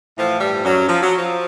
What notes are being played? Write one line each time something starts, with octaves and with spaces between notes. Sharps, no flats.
A2 E3 F3
G2 G3
F#2 F#3
F3
F#3
F3